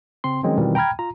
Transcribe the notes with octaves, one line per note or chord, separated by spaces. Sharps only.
C#3 C4 C6
D#3 F3 F#3 G#3 C4 C#4
B2 D#3 E3 G3 C4 F4
G5 A#5 B5 F6 G#6
F4 A#5